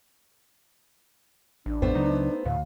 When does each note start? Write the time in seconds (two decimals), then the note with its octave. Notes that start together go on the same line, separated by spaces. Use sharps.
1.66 A1 D4
1.82 A#1 F2 A2 A3 B3 C5
1.95 C#2 C#3 F#3 D#4
2.46 D2 A2 F5